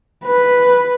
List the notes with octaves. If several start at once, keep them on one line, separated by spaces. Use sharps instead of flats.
B4